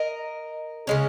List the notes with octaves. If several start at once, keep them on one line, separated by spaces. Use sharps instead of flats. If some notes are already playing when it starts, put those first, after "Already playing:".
Already playing: A#4 D#5
C#3 G#3 C#4